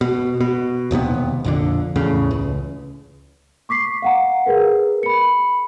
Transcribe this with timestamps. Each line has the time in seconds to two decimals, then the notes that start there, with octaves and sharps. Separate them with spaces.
0.01 B2
0.41 B2
0.91 E1 D#2 C3 B3
1.44 A#1 F2 D3
1.96 E2 A2 C#3
2.31 C#2
3.69 C#6 D6 B6 C7
4.02 F5 F#5 A#5
4.46 G#4 A#4 B4
5.03 B5 C#7